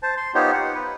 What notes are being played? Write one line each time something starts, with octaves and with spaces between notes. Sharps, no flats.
C5 A5
C6
B3 D#4 F4 G4 C5 C#5
F#5
B4